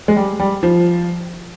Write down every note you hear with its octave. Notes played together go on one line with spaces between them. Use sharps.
G#3
G3
G3
F3